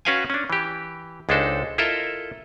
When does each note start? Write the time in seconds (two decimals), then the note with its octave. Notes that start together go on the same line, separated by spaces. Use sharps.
0.05 C#4 F#4 B4 F5 G5 G#5
0.30 C#4 D4
0.50 E3 G4
1.29 C#2 G#3 D4 D#4 A4 C5
1.78 E4 F4 A4 A#4 D#5 E5